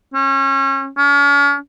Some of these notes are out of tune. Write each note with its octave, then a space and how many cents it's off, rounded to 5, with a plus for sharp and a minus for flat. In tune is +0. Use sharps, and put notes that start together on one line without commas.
C#4 -30
C#4 +40